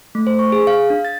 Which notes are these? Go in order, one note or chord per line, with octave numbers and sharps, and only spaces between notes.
A3
C5
C#6
G#4
F5
D4
A6